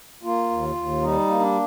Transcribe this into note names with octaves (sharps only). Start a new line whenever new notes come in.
A#3 F4
D#2
D#2
G3 D#4
A#3
D4